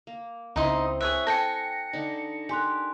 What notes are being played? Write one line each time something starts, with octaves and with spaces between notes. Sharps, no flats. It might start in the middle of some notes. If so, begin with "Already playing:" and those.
A#3
C#2 C4 D#4 E4 D#5 C6
G#4 C#5 E5 F#6
A4 G5 G#5 A#6 C#7
D3 D#4
G4 A#4 G#5 C6 F#6